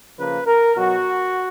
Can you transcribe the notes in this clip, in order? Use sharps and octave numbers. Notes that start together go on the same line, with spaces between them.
C#3 F3 A#3 B4
A#4
B2 F#3 F#4